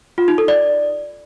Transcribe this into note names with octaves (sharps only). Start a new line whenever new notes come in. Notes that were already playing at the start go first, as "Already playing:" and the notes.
F4
D#4
A4
D5